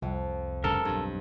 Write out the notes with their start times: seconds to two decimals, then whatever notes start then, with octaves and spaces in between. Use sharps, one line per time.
0.02 C2 F2
0.64 F1 G2 C#3 A4 A#4
0.85 B1 G2